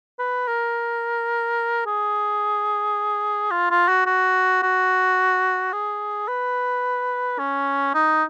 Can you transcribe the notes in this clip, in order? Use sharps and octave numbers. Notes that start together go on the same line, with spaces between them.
B4
A#4
G#4
F4
F4
F#4
F#4
F#4
G#4
B4
C#4
D#4